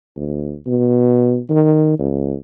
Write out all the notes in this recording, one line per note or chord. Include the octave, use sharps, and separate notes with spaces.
D2
B2
D#3
C#2